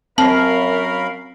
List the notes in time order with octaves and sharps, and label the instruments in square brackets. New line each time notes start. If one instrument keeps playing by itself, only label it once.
[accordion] F#2 F5 B5 [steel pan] C4 [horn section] C#4 A#4 [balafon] A5